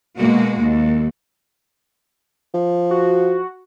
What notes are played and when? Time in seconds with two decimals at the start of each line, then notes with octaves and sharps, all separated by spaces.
0.16 B2 G#3 A#3 F#4
0.61 D#2
2.54 F3
2.91 F#4